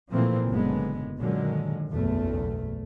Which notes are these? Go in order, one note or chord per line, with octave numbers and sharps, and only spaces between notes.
A#2 E3 F3 A3 A#3 C4
F#1 F#2 D3 G#3 B3
A#2 D3 D#3 F#3 G#3
F#1 B1 E2 A3